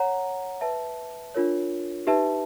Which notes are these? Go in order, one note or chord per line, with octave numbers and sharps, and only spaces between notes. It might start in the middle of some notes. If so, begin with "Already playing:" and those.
Already playing: C#5 F#5 A#5
B4 E5 A5
D4 F4 A#4 C#5
D#4 G4 B4 E5 A5